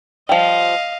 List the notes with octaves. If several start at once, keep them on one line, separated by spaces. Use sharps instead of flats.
F3 G3 D#5 F5